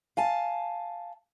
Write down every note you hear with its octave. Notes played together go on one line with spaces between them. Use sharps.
F5 G#5 A5